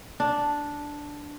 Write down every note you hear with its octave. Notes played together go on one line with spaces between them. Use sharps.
D4